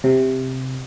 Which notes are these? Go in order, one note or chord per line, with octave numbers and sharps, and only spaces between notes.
C3